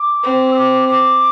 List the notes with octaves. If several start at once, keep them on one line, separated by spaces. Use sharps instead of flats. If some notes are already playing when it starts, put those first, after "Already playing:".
Already playing: D6
C4
E6
D6
D6